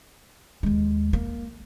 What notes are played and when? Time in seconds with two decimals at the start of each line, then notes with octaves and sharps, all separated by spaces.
0.63 D#2 G#3
1.13 A#3